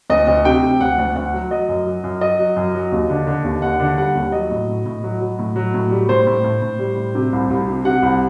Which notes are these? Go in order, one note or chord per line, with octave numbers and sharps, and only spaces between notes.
D2 D#5
D2
C3 G5
C3
D2 F#5
D2
D2 F#5
F#3
F#3 D#5
F#2
F#3
F#2
F#3 D#5
F#3
F#2
F#3
D#2
D3
D3
D#2
D#2 F#5
D3
G3 F#5
D#2
F#3 D#5
A2
A2
A2
F#3
F#3
A2
F#3
A2
G3
A2 C5
A2
A2
A2
G3
A2
C3
C2
C2
C3
C3 F#5
C2